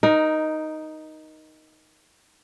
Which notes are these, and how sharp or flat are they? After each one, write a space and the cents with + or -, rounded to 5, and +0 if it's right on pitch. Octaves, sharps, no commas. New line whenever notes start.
D#4 +0 A#4 +20